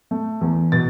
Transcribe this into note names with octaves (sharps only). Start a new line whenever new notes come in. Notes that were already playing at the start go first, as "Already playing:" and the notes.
A3
E2
B2 A6